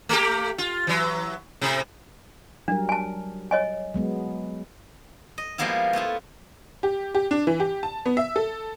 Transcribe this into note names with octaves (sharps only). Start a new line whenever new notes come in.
A3 A#3 G4
F4
E3 F#3
A2 C3
F#3 G3 D4 A#4
G#5 A5
C#5 D#5 G#5
F#3 G#3 B3
D#5
F3 G3 G#3 A#3 B3 E4
A3 B3 E4 F4
G4
G4
D4
E3
G4
A5
B3
E5
A4